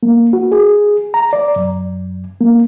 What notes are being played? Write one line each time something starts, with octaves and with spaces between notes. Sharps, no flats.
A#3
F#4
G#4
A#5
D5
F#2
A#3